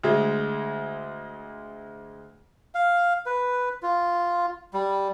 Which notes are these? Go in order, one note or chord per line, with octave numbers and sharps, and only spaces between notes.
D2 G#3
F5
B4
F4
G3